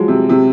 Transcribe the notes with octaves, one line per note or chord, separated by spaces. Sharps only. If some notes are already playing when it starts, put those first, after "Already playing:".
Already playing: F3 F#3 G#3
C3
C3